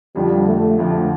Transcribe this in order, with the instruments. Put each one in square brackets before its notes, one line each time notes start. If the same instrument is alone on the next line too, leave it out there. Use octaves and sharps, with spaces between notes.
[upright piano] F2 D3 F3 [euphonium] G3
[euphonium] A3
[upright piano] F2 D3 F3 [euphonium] A3